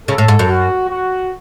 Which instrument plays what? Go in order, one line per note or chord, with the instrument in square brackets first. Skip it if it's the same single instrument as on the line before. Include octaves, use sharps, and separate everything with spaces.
[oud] C#3 [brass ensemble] A4
[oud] A2
G#2
F#2
[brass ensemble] F#4
F#4